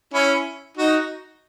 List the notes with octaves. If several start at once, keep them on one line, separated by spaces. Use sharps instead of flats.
C#4 E4
D#4 F#4